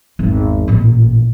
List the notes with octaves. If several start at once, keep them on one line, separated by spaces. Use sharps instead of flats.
G#1 E2
A1 A#2